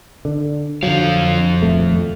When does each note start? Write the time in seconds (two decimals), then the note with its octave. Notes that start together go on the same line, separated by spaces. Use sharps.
0.25 D3
0.83 F2 D3 F3 F#3 F5
1.61 D#1 A3